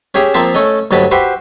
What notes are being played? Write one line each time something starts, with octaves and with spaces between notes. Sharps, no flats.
C#4 G4 G#4 E5 A#5
F3 A#3 C4 E5 A5
A3 C#4 A4 D#5
D2 G2 F#3 D#5 A5 B5
F#4 G4 B4 C5 E5